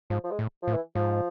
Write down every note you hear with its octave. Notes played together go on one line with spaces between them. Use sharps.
G#2 F3
F3
G#3
A2
A2 F3
E3
G#2 F3